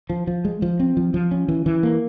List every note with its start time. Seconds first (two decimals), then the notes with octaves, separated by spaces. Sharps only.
0.10 F3
0.27 F3
0.45 G#3
0.62 F3
0.80 C4
0.97 F3
1.14 F3
1.31 C#4
1.48 E3
1.66 E3
1.83 A#3